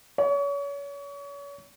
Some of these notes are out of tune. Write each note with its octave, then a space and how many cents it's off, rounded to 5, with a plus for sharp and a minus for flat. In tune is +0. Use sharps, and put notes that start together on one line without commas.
C#5 +35